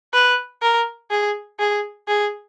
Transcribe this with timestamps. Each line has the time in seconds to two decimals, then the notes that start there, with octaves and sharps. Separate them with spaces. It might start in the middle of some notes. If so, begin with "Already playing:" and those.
0.14 B4
0.62 A#4
1.11 G#4
1.60 G#4
2.08 G#4